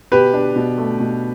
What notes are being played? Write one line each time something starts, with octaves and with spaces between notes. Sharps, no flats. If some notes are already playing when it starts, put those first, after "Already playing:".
B2 G4 B4
D4
B2
A3
B2